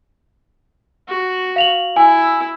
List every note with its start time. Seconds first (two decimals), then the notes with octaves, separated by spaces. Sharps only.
1.08 F#4
1.56 F5 F7 F#7
1.97 E4 G#5